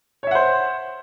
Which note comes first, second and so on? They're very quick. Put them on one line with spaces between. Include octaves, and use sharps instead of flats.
C#5 E5 F#5 C5